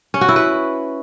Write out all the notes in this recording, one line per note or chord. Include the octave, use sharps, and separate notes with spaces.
C#4
F#4
E4
B4